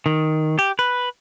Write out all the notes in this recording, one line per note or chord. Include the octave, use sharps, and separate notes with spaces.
D#3
G4
B4